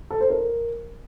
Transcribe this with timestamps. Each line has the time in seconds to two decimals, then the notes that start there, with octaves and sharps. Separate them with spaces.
0.10 A4
0.20 C5
0.30 A#4